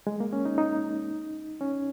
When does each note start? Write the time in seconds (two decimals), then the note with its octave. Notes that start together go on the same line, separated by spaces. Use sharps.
0.07 G#3
0.20 A#3
0.33 C#4
0.45 D#4
0.58 D#4
1.61 C#4